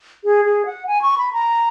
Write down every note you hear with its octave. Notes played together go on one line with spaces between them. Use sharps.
G#4
G#4
F#5
G#5
C#6
B5
A#5